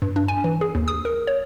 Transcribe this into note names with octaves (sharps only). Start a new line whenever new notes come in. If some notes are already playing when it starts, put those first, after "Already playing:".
G2
D4
G#5
E3
G#4
D#2
D#6
A#4
C#5